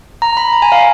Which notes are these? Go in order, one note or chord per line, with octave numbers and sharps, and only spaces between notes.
A#5
B5
A#5
G#5
F5